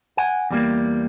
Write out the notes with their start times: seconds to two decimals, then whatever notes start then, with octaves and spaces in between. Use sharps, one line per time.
0.17 F#5 G#5
0.51 E2 G3 A#3